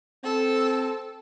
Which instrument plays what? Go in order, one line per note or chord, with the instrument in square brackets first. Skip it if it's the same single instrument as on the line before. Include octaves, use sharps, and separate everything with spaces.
[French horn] C4 [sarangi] A4